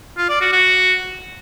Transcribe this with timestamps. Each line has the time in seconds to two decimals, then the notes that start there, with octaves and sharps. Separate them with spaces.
0.17 F4
0.29 D5
0.41 F#4
0.53 F#4